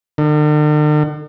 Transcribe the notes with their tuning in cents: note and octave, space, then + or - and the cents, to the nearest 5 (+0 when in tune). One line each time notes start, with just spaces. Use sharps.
D3 +45